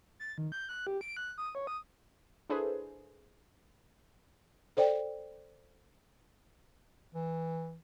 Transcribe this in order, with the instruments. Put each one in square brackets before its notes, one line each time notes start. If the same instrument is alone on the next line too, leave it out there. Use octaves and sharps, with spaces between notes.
[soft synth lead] A6
D#3
G6
F#6
G4
D7
F#6
D#6
C#5
D#6
[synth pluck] D4 E4 G#4 A4 B4 C5
[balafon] A4 C5 D5 G5
[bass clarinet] E3